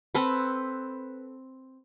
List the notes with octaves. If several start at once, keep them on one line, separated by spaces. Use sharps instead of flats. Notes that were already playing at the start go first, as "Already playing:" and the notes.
C4 A4 B4